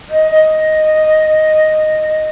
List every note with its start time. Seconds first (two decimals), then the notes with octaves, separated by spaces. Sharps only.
0.10 D#5
0.31 D#5